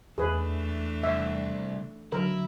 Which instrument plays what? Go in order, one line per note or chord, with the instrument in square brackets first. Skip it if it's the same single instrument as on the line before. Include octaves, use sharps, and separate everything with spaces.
[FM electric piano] E2 [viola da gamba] E3 A3 D4 [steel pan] G#4 B4
[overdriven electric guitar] C2 [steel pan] E5
[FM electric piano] D3 F#3 [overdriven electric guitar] E4 [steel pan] A#4